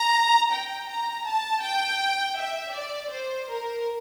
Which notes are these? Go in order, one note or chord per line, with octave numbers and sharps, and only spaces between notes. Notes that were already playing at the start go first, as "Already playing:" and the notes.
Already playing: A#5
G5
A#5
A5
G5
E5
D5
C5
A#4